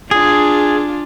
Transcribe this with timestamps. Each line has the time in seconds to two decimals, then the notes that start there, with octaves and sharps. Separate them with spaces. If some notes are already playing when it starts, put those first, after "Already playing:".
0.11 D4 F4 G#4